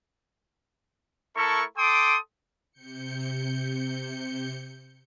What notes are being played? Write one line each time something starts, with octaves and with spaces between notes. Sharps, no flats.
A3 E4 A4 A#4 C#6
A4 G5 C6 D6 D#6
C3 G6 C#7